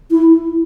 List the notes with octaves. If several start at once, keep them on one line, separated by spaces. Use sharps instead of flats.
E4